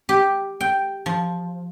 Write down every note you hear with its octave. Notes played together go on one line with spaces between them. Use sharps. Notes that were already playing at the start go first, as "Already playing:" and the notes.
G4
G5
F3